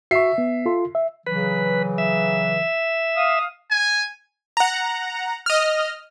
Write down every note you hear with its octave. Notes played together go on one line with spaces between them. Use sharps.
F#4 E5 C#6 C7
B3
F4 A4 C6
E5
C#3 E3 F#3 B4
E5
F5 D#6
G#5
F#5 A#5
D#5 F6